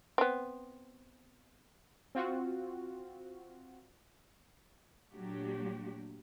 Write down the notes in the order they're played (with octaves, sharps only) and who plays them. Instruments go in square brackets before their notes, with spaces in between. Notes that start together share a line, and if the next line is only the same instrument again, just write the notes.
[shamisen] B3 C4
[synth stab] C4 F4 F#4
[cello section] A#2 F#3 A3 D4 F#4 G4